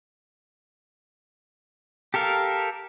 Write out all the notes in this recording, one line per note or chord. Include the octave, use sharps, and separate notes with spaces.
G4 A4 A#4 F5